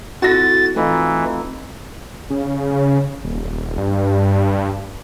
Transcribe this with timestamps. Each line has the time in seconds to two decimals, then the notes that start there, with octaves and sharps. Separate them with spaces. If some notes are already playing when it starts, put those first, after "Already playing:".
0.22 C4 E4 F#4 A4 A6 A#6
0.76 E3 A3 C4 D#4 F4 A#5 B5
2.30 C#3
3.24 D#1
3.78 G2